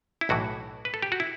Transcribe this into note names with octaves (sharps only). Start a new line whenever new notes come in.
E4
B1 A2 E3 F#4
B4
A4
G4
F#4
E4